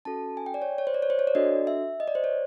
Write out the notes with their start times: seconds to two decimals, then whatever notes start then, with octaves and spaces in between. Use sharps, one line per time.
0.05 C#4 F#4 A4 A5
0.37 G#5
0.46 G5
0.54 D5
0.62 C#5
0.78 C#5
0.87 C5
0.94 D5
1.02 C#5
1.10 C5
1.19 C#5
1.27 D5
1.35 D4 F#4 A4 D#5
1.67 E5
2.00 D#5
2.08 D5
2.15 C5
2.24 C#5